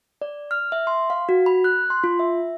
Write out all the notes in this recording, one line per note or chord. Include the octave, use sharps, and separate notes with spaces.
D5
F6
E5
C6
F5
F#4
B5
F#6
C6
F4
E5